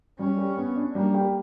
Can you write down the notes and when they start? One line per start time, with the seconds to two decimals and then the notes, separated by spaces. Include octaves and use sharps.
0.19 G3 C#4
0.38 G4
0.57 B3
0.76 D4
0.95 G3 A#3
1.14 G4